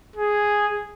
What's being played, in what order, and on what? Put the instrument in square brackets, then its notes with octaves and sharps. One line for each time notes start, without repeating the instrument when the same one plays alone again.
[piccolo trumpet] G#4